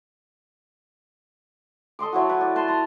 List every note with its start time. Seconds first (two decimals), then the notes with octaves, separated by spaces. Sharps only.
1.99 A4 D#5 C6 D6
2.13 F#3 E4 F#4
2.26 B4 C#6
2.41 D5
2.56 B4 A5 C6
2.68 A#5 C6